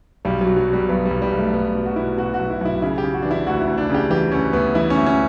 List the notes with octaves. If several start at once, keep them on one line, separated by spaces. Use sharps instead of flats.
B1 G3
F#3
B2
F#3
B2
G3
B1 B3
G3
B1
G3
B1
A3
B1 B3
B2
F#4
B2 E4
B2 F#4
F#4
B1
E4
B1 E4
C#3 E4
G4
C#3
F#4
E3 D4
E4
D2 F#4
E4
D2
D4
C#3 G4
E3 G4
D2 C#4
D2 B3
E3 E4
C#4
D2
C#4